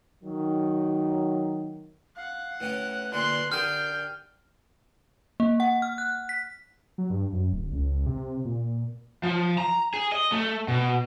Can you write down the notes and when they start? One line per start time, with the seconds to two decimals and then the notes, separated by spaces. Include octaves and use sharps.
0.24 D#3 F#3
2.17 F5 F#5
2.60 A2 C#4 B4
3.13 A#2 D3 C6 F#6
3.52 D3 G4 G#4 A#4 G5 F6
5.40 A#3
5.60 F#5
5.82 F6
5.98 F#6
6.29 B6
6.98 F#3
7.10 G2
7.33 F#2
7.53 D1
7.72 C#2
8.06 C3
8.45 A#2
9.23 F3
9.58 A#5
9.94 G#4
10.12 D#5
10.32 A3
10.68 B2